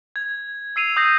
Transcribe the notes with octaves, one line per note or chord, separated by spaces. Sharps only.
G#6
E6 C7 D#7 F7
D#6 G6 A#6 C7